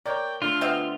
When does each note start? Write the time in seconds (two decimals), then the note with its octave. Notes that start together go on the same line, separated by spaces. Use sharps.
0.06 A#3 A#4 C#5 D5 G5
0.42 D3 A3 F4 F6
0.61 B2 C4 E5